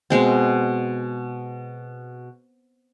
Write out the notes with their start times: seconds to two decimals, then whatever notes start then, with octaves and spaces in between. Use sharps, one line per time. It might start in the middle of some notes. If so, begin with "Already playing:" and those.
0.10 B2 G#3 C4